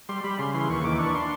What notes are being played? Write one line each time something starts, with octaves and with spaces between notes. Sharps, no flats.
G3 C6
G3 B5
C#3 C6
E3 C6
D#2 C#6
E3 D6
D4 C#6
D4 C6